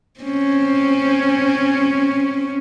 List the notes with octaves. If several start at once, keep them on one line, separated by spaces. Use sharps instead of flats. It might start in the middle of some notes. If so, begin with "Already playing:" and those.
C4 C#4